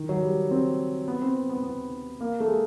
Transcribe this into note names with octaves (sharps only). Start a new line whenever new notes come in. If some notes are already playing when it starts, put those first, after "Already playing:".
Already playing: D#3
F#3
G3
C4
B3
C4
B3
B3
B3
A#3
A3
G#3